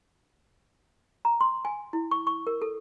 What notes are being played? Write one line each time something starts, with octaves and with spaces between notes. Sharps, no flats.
A#5
C6
G#5
E4
C#6
C#6
A#4
A4